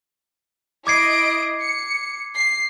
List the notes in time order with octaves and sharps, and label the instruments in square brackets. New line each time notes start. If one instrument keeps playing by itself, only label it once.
[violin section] E4 D#5 D7 [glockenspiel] D6 G#6 C7
[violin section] C#7
C7